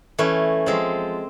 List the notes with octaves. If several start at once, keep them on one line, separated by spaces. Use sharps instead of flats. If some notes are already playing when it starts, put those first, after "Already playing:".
E3 A3 C#4
F3 G#3 C4